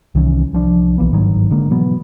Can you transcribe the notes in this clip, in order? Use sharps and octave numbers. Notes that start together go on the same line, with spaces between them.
C2 D#3 E3 C#4
C2 F3 D4
B1 E3 A#3 B3
G1 G#2 D#3 F#3
D3 G#3 A#3
B2 E3 F#3 B3